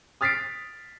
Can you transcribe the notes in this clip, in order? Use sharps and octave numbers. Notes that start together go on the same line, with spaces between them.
D#6 F6 A6 B6 C7 D7